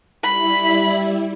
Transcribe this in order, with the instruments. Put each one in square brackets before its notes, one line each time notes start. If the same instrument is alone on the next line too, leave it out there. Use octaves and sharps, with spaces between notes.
[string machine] G3 E4 [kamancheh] B5